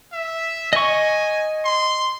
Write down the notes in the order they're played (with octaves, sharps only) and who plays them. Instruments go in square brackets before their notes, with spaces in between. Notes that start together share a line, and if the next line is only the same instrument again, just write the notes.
[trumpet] E5
[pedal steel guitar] D#5 C#6 [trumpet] G#5
[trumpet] C6